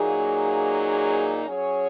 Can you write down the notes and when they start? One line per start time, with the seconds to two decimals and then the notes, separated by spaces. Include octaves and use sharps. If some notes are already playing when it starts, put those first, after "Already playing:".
Already playing: A#2 F#3 A#3 D#4 G#4
1.45 F#3 C#4 G#4 C#5